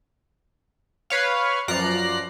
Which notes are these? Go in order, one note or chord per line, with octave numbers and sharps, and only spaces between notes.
B4 C#5 F5
F#2 F3 D5 A#5 F#6 C7